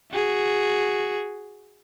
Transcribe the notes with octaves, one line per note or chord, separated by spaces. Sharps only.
F#4 G#4